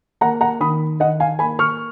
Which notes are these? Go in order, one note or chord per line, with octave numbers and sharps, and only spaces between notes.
A#3 F#5 A#5
F#5 A#5
D#3 B5 D#6
D#3 D#5 F#5
F5 G#5
A#3 G#5 B5
C#6 F6